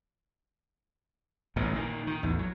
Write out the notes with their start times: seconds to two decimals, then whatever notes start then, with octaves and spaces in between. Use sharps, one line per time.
1.56 A1 G#2 B2
1.73 A#2 D#3
2.07 D#3
2.23 A1 E2
2.39 F#3